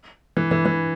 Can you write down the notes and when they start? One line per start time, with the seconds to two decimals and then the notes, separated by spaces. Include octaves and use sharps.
0.37 E3
0.51 E3
0.65 E3